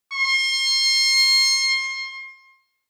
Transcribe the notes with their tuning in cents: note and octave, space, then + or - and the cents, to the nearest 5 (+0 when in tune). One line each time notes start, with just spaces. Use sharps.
C6 +35